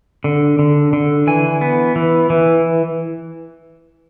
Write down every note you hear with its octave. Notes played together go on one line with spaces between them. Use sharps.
D3
D3
D3
E3 G#5
B3
E3
E3